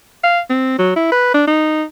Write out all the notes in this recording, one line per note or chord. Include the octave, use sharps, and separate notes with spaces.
F5
C4
F#3
E4
B4
D4
D#4